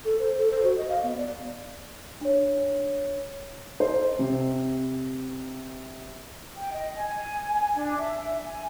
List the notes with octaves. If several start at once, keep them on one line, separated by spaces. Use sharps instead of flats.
A4
C5
A4
C5
F#4
D#5
F5
B3
D5
D4 C#5
C5
C3
G5
D#5
G#5
D4
E5
G#5